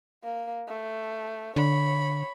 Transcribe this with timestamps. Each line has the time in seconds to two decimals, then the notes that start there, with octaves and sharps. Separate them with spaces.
0.23 A#3
0.68 A3
1.56 D3 C#5 B5